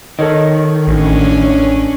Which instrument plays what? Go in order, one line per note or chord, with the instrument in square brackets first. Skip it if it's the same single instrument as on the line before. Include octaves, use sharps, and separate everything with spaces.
[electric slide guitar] D#3 [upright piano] A4 C#5 D#5
[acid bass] A1 [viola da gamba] C#4 D4